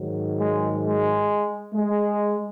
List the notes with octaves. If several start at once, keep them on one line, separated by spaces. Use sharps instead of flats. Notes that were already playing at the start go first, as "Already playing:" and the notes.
Already playing: G#2 D#3 F#3
G#3
G#3
G#3